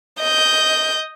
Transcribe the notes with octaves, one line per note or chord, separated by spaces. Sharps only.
D#5 G6